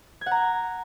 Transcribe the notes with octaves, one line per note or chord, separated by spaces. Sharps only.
G#6
F#5
A#5